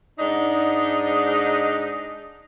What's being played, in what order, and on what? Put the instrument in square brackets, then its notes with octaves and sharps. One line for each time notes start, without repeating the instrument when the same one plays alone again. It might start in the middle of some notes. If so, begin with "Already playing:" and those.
[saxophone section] G#2 D4 D#4